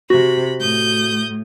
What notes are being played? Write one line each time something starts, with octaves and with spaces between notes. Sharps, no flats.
C3 F#4 B5
A2 D#6 G6